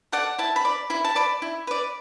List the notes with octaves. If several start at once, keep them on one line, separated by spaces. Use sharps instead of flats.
A4 D5 F#5
E4 A5
B5
D5
E4 B5
A5
D5 B5
E4
B4 D5